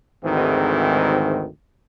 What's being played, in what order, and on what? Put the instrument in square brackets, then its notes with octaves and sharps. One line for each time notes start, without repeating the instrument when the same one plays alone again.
[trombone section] G#1 D2 G#2 D#3 E3 C4